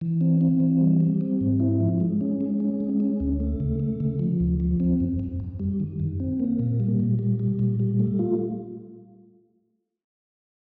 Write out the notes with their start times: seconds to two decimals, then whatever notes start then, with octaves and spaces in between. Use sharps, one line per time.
0.01 E3
0.21 C4
0.41 C4
0.60 E3
0.81 G3
1.00 G3
1.21 C4
1.41 G#2
1.60 E4
1.80 F3
2.00 G#3
2.21 C#4
2.41 G#3
2.60 C#4
2.80 G#3
3.00 C#4
3.20 D2
3.40 A3
3.60 C#3
3.80 A3
4.00 C#3
4.19 F3
4.40 D2
4.60 F3
4.80 C4
5.00 F#2
5.19 F#2
5.40 F#2
5.60 G3
5.80 D#3
6.00 F#2
6.20 C4
6.40 A#3
6.59 A#2
6.80 G3
7.00 A#2
7.19 G3
7.39 G3
7.59 A#2
7.80 G3
7.99 A3
8.19 F4